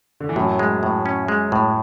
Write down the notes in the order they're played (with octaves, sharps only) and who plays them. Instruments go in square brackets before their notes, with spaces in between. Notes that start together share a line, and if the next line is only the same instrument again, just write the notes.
[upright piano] D3
E3
[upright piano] F#2 F#3 [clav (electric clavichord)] A2
[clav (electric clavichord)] G#3
A2
C#4
G#3
A2